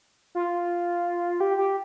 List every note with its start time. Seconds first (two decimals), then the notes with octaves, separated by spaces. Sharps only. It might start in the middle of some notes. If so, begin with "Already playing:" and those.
0.35 F4
1.40 G4
1.57 G4